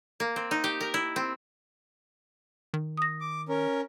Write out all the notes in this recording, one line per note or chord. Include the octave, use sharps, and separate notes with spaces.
A#3
C4
D#4
G4
A#4
E4
C4
D#3
D#6 A#6
D6
C#4 A#4